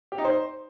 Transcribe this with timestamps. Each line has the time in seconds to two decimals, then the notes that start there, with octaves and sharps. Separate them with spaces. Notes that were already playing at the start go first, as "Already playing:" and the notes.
0.12 G4
0.18 D#4
0.25 C5